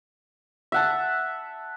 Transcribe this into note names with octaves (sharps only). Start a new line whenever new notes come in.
E5 F#5 A5